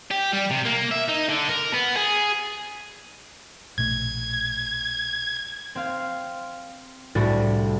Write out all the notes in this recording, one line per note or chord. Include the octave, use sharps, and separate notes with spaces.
G4
G3
C3
A#3
E5
D#4
D3
A#4
B3
G#4
A#1 B2 A3 G#6
C4 F5
C2 A2 G3 D4 F#4